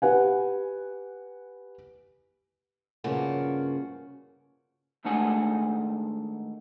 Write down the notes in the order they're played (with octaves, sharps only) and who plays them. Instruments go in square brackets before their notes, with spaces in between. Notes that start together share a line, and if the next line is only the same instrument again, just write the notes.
[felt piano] G4 B4 F#5 G#5
[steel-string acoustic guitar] G2 C#3 F3 A#3 F#4
[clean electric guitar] D#3 G#3 A3 D4 F#5 G#5